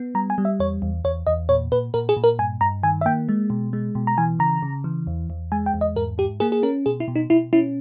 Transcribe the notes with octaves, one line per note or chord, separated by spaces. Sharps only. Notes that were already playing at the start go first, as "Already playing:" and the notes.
Already playing: B3
G3 A#5
G#5
G3
E5
E2 C#5
E2
E2 C#5
E2 D#5
A#2 C#5
A#2 B4
A#2 A#4
G#4
A#2
A#4
G2 G#5
G2 A#5
D#3 G#5
E5
A#3 G5
G#3
B2
G#3
B2
A#5
E3 G#5
C#3 A#5
C#3
E3
E2
E2
G#3 G#5
G5
E2
D#5
G#2 A#4
G#2 G4
A#3 G#4
G#4
C#4 A#4
B2 G#4
E4
B2
D#4
B2 E4
C#4 E4